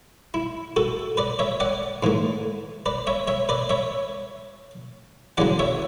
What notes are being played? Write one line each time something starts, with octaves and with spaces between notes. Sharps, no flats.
E4
F#4 A4
B4 D5
C#5 E5
D5 F#5
G#2 E3 A3
B4 D5
C#5 E5
C#5 E5
B4 D5
C#5 E5
E2 C#3 F#3 D5 F#5
C#5 E5